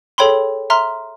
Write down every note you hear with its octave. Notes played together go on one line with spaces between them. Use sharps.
G#4 A4 C#5 G5 B5 C6
E5 A#5 C6 F6